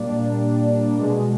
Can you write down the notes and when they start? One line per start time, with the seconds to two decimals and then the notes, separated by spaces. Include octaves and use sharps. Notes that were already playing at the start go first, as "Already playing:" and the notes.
Already playing: A#2 G3 A#3 D4
0.98 B2 G#3